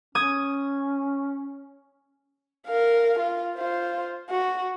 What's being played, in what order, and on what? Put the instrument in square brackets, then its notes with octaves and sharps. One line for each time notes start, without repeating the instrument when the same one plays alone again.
[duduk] C#4 [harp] D#6 G#6
[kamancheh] A#4 F5
F4
F4 C5
F#4